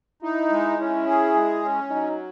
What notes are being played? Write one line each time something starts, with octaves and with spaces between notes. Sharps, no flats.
D#4 E4
G#3
C#4 E4
G#4
G#3
C#4
F#3 D#4